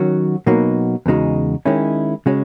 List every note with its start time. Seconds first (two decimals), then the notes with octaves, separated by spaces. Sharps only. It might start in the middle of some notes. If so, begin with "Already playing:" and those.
Already playing: D#3 F#3 C#4 F#4
0.46 B2 F#3 A#3 D#4 F#4
1.06 E2 C#3 G#3 D#4 F#4
1.65 D#3 G#3 C#4 E4
2.26 C#3 G#3 C#4 F#4